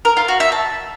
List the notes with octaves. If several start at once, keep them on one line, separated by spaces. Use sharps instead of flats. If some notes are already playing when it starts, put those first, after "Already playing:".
A#4
F4
F#4
E5
A5